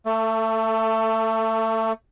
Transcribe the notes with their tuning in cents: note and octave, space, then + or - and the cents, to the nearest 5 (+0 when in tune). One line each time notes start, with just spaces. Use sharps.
A3 +25 A4 +0